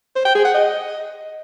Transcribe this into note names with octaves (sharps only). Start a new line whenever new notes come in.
C5
G5
G#4
F#5
D#5